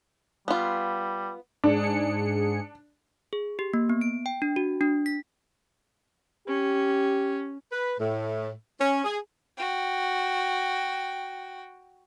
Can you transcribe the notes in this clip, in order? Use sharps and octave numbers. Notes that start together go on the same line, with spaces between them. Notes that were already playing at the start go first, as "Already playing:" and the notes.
G3 B3 F4
G#2 D4 G#4 C#7
G#4
G4
A#3
B3
D7
G5
D4
F#4
D4
B6
C#4 G4
B4
A2
C#4
G#4
F#4 G5